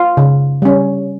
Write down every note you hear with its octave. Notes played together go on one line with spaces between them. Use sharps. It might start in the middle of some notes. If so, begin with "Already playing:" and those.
Already playing: F4
C#3
G3 C#4